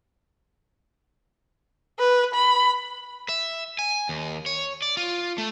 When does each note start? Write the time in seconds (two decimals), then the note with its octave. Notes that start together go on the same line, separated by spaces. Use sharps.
1.99 B4
2.34 B5
3.29 E5
3.79 G#5
4.09 D#2
4.46 C#5
4.82 D5
4.97 F4
5.38 A3